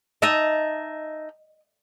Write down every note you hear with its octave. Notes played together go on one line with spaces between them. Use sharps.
D#4 D#5 E5 A5